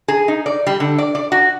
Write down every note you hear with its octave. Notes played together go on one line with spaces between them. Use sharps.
G#4
D#4
D5
G3
D3
D5
D5
F#4